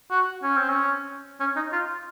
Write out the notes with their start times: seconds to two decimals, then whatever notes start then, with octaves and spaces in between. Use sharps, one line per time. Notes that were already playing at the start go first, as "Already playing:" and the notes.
0.11 F#4
0.43 C#4
0.57 C4
0.70 C#4
1.40 C#4
1.56 D#4
1.73 F4